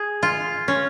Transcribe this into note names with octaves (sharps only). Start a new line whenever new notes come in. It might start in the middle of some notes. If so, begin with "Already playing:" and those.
Already playing: G#4
F4
C#4